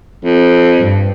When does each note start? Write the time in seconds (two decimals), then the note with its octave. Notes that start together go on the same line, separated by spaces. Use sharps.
0.24 F2
0.78 G2